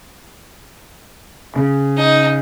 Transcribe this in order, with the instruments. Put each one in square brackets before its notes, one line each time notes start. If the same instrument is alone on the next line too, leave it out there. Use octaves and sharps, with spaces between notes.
[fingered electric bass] C#3
[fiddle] D#4